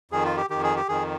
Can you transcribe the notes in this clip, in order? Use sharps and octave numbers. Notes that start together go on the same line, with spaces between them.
F2 D#3 G#4
F4
G4
F2 D#3 G4
G#4
G4
F2 D#3 G#4